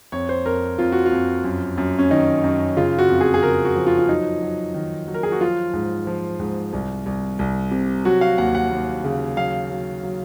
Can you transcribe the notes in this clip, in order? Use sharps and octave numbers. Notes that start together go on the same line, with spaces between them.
F2 C#5
C5
F2 A#4
F2 F4
F#4
F4
F2
F#2
F#2
C#4
D#3 D#4
F#2
C#3 F4
F#4
F2
G#4
G#4
C#3 A#4
F#4
F3
F4
F4
F#3 D#4
F#3
D#3
F#3
A#4
G#4
F#4
F3 F4
G#2
F3
G#2
C2
C2
C2
C3
F#3 F#4
F5
D#2 F#5
F#5
D#2
C#3
F#3 F5
F#3
F#3